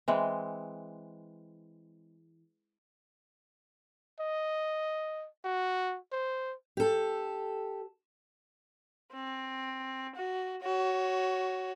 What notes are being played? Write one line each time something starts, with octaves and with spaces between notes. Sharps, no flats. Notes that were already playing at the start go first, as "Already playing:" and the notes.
E3 G#3 C4
D#5
F#4
C5
G4 A4
C4
F#4
F#4 C#5